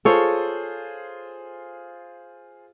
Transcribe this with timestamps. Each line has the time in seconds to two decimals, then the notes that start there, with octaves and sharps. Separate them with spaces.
0.05 F4 G#4 A4 C5 C#5